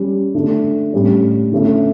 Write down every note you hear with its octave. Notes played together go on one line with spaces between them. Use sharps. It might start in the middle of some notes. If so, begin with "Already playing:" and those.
Already playing: G3 C#4 G4
D3 A3 D4
A2 G3 C#4
D3 A3 C#4 E4